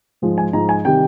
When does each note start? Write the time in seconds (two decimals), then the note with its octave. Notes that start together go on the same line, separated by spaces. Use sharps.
0.22 G#2 F3 G#3
0.38 G#5
0.53 G#2 F3 G#3 A#5
0.69 G#5
0.85 C3 D#3 G3 G5